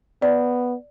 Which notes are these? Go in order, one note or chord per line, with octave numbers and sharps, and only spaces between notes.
B3 D5